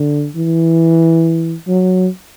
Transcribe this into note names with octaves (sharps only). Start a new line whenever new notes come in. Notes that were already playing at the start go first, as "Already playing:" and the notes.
Already playing: D3
E3
F#3